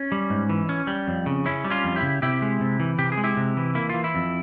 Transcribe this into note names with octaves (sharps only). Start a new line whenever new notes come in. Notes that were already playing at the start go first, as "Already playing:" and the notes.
Already playing: C#4
G3
G#2
E3
C#4
G3
F2
C#3
C#4 E4
G3
C#4 F4
F2
E4 G4
C#3
C3 E4 G4
G#3
C3
E3
C3 G4
G#4
G#3
E4 G4
C3
E3
A#3 E4
E3 F4
E4
F2